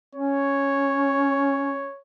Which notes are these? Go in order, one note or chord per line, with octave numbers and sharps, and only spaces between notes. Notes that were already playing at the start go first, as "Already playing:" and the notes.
C#4 C#5